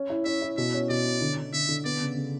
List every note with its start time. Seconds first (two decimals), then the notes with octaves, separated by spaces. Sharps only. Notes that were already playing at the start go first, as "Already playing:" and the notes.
Already playing: C#4
0.10 E4
0.25 C#4 E5
0.42 E4
0.57 B2 E5
0.74 C#4
0.89 B2 D5
1.05 C#4
1.21 D3
1.37 D3
1.53 D3 E5
1.69 D3
1.85 B3 D5
2.01 C#3
2.16 C#3